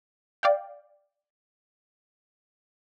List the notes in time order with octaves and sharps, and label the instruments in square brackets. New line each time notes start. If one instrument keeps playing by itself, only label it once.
[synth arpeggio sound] D5 F5 G5